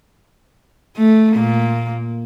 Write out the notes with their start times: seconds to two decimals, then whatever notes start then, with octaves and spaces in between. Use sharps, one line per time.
0.97 A3
1.32 A#2 A#3